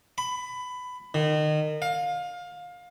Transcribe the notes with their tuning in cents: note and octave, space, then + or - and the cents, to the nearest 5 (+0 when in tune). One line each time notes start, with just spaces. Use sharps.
B5 +15
D#3 -30
F5 +25